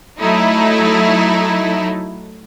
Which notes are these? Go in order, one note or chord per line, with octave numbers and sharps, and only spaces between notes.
F#3 A3 D#4 E4